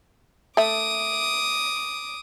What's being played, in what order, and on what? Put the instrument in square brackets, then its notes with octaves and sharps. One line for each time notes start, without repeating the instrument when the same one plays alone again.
[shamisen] A3 E5 [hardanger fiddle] D6 D#6